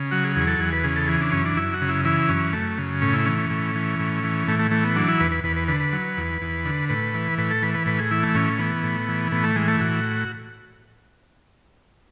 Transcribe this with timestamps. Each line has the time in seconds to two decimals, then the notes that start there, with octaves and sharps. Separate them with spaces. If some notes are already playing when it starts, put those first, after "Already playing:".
Already playing: C#3
0.11 F#3 F#4
0.24 G#4
0.36 E2 G#4
0.47 A4
0.59 E2 G#4
0.72 B4
0.84 C#3 G#4
0.96 A4
1.08 E3 G#4
1.21 D4
1.32 F#2 C#4
1.45 D4
1.57 F#2 E4
1.73 F#4
1.82 C#3
1.89 E4
2.05 E3 E4
2.29 F#2 C#4
2.53 F#2 A3
2.78 C#3
3.01 A2 C#4
3.14 E4
3.26 E3 C#4
3.38 C#4
3.50 A2
3.75 E3
3.99 A2
4.24 E3
4.47 A2 A3
4.59 A3
4.71 E3 A3
4.84 B3
4.95 F#3 D4
5.08 E4
5.20 E2 B4
5.32 B4
5.44 E2 B4
5.56 B4
5.68 D3 B4
5.80 B4
5.93 F#3
6.17 E2
6.42 E2
6.65 D3
6.89 A2 B4
7.14 E3
7.38 A2 B4
7.51 A4
7.62 E3 B4
7.74 B4
7.86 A2 B4
7.99 G#4
8.11 E3 E4
8.23 A3
8.35 A2 C#4
8.59 E3 B3
8.83 A2
9.08 E3
9.31 A2 B3
9.43 A3
9.56 E3 G#3
9.68 A3
9.80 A2 F#4